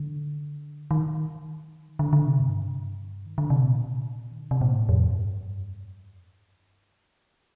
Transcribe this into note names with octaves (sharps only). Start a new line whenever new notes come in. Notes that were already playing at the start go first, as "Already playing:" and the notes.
Already playing: D3
D#3
D3
D3
C3
G2
D#3
D3
C3
A#2
D#3
D3
C3
A#2
A2
F2
G2